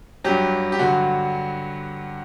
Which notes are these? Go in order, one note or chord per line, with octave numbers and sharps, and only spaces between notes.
G2 F#3 G4
G4
G2 D3 F#3 F#4